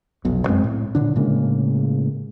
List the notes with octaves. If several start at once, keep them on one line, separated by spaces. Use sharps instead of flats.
F1 B1 B2
F#2 G#3 C4
A2
A#2 D3 D4
A2 C#3 G#3 A#3